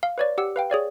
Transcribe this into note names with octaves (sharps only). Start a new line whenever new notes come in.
F5
B4 C#5 D5
G4 F#5 E6
B4 F5 G5
G#4 C#5 D5 F5